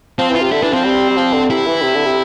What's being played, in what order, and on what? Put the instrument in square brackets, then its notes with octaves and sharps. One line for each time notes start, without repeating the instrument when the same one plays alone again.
[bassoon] F3 [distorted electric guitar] C4
[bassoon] E3 [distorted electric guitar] F4
[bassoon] C3
[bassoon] D3 [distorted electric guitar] E4
[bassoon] E3 [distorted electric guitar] D4
[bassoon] F3 [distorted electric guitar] C4
[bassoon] G3
G3
F3
D3
[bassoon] C3 [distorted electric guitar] E4
[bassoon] E3
C3
D3
C3